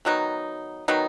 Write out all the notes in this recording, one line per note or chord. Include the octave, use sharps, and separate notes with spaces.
D#3 F#3 B3 D#4
D#3 F#3 B3 D#4